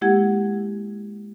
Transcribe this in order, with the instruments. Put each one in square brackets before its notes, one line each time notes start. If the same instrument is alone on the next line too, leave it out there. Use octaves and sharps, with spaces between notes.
[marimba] G#3 A#3 E4 G4 F#5 G#6